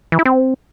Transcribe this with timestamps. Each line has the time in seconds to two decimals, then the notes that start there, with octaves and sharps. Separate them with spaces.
0.12 E3
0.19 E4
0.25 C4